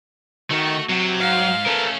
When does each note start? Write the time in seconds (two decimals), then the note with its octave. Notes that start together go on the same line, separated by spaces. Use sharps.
0.51 D#3 A3 F#4
0.89 C3 F#3
1.20 G#2 F5
1.66 A3 C#4 A4 A#4